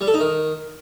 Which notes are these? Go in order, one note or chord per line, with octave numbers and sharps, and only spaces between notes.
G3
A4
D#4
D#3